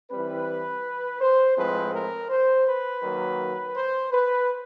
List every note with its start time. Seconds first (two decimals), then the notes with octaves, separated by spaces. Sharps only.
0.11 E3 G3 C4 B4
1.21 C5
1.57 A2 F3 G#3 C4 B4
1.93 A#4
2.30 C5
2.66 B4
3.03 D#3 F#3 A#3
3.76 C5
4.12 B4